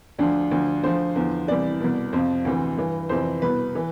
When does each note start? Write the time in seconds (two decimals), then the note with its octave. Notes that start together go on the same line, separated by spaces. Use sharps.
0.18 D2 D3 F3 D4
0.51 D2 D3 F3
0.83 D2 D3 F3 C5
1.16 E2 D3 F3
1.48 C2 C3 E3 D5
1.80 C2 B2
2.13 F2 C3 F3 C5
2.45 D2 C3 E3
2.77 G2 E3
3.09 F2 C3 E3 C5
3.42 C2 B2 B4
3.75 E3